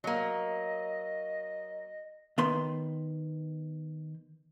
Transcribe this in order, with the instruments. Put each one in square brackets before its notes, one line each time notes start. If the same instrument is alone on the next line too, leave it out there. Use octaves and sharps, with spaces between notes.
[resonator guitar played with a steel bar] F#3 A#3 [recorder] D#5
[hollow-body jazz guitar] D#3 B3 C6